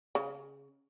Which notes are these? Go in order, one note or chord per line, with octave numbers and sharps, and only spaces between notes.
C#3